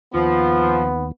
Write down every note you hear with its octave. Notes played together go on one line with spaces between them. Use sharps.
D#2 F3 B3